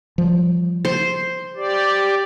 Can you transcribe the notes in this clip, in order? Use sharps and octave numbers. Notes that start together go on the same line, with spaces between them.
F3 G3
C5
G4 D5